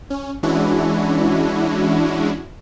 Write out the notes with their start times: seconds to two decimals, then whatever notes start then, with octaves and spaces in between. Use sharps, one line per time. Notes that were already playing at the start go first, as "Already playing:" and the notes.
0.10 C#4
0.43 E3 G#3 C#4 D4 E4 F#4